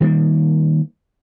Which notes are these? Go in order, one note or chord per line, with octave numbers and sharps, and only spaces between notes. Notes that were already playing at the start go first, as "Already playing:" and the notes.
D#3 G3 A3 A#3